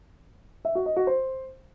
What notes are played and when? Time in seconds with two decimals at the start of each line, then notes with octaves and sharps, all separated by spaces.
0.65 E5
0.75 F#4
0.86 D#5
0.96 F#4
1.07 C5